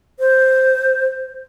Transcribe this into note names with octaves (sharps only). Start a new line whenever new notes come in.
C5